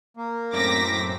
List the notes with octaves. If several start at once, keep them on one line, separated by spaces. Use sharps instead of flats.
A#3
F#2 A2 C4 D6 A#6 B6